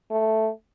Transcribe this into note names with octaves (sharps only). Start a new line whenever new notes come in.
A3